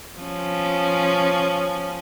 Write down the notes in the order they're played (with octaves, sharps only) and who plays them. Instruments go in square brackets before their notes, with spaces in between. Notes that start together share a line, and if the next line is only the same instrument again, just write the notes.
[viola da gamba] F3 C#4